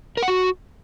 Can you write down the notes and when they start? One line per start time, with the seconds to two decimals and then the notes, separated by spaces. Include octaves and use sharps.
0.17 A#4
0.23 F#5
0.28 F#4